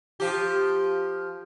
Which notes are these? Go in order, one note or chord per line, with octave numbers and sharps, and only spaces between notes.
F3 G4